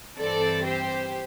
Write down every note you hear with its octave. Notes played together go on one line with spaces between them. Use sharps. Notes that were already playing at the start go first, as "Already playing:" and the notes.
G2 E3 C4 A4 D5
G4 C5